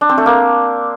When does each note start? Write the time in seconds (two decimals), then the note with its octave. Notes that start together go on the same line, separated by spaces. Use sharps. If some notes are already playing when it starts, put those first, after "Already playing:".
0.01 D4
0.09 C4
0.18 A3
0.26 A#3